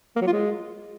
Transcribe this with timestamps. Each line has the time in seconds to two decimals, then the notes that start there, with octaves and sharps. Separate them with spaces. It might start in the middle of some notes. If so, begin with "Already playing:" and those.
0.16 A#3
0.21 F#3
0.27 F4
0.32 G#3